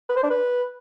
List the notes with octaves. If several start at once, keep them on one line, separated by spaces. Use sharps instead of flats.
B4
C5
D4
B4